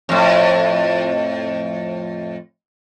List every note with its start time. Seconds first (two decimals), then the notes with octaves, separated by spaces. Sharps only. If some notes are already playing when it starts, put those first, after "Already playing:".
0.09 F2 A2